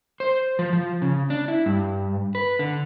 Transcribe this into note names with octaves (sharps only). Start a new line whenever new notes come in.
C5
F3
F3
C#3
D4
E4
G2
B4
D3